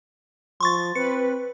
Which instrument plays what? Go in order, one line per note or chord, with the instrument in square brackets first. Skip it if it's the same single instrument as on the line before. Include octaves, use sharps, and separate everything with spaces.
[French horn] F3 [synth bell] C6 C#6 A6
[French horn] C4 [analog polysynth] B4 [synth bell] C#7